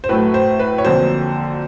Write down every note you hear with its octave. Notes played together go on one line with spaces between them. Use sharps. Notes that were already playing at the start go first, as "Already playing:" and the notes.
C5
A2 F#3 A3 B4
C5
B4
C#5
F2 D3 F#3 A#3 C5